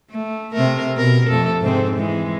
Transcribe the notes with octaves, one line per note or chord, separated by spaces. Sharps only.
A3
C3 A3 A#4
B2 A#4
F2 A3 A4
G#2 C3 C4
E3 G#3